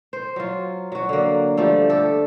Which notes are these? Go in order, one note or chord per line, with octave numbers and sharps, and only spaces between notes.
C5
F#3 F4
F#3 F#4
D3 A#3
F3 G3 A3
G4 A4